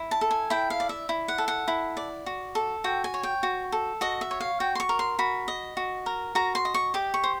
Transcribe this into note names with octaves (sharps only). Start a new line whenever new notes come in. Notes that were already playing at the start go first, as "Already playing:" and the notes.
Already playing: E4
A5
A4
G#5
E4 G5
F5
D5
E5
E4
F#5
A4
F#5
E4
D5
F#4
A4
F#4 G5
G#5
C#5
G5
F#4
A4
F#4 D#5
E5
C#5
F5
F#4 G5
C6
C#6
A#4
C6
F#4 B5
D#5
F#4
A#4
F#4 A#5
C6
D#5
C#6
G4 D6
C#6
C5